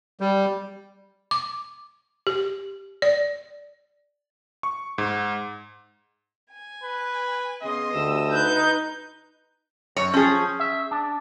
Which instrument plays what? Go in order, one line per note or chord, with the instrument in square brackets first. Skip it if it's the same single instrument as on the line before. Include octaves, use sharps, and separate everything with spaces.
[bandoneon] G3
[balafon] D6
G4
D5
[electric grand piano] C#6
G#2
[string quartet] G#5
[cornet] B4
[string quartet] C#3 C6 [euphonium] B3 [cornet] D#5
[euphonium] D2 [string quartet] G4 E6
[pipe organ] D#4 G6 [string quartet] B4
[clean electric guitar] F#2 [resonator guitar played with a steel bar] C#5
[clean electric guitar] F3 [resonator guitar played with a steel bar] C#4 G#4
[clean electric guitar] E5
D4